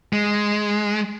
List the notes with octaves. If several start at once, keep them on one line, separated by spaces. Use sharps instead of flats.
G#3